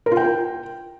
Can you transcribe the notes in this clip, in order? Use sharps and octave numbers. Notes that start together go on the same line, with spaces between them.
A#4
F4
G5